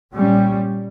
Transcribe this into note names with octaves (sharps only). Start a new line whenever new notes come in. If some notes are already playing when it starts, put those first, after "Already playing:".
A#2 G3 C#4